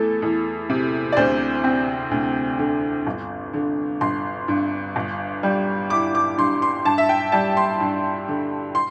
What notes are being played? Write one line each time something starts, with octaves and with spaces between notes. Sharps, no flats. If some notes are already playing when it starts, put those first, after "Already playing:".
Already playing: E2 A3 A4
E2
C3
D5
D2 C5
C4
D2
D3
G1
D3
G1 C6
G2
G1
G3
E4 D6
D6
G2 C6
C6
G2 A5
E5
G5
G3 A5
C6
G2
D3
C6